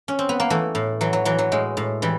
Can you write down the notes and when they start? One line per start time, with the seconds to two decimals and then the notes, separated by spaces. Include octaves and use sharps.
0.08 C#4
0.19 C4
0.29 B3
0.40 A#3
0.50 E3 A3
0.75 A2
1.01 E3 F#3
1.13 F#3
1.25 E3 F#3
1.39 F#3
1.52 A2 G#3
1.77 A2
2.02 E3 G3